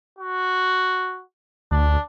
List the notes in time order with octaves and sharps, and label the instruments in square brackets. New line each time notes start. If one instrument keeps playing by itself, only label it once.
[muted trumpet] F#4
[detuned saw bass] D2 [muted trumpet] D4